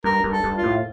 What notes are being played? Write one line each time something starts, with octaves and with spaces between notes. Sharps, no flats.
G2 A#4
G2
A4
G2
F4
A2